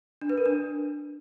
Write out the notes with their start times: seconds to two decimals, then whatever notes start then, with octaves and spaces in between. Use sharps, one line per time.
0.21 D4
0.30 B4
0.38 A#4
0.46 D4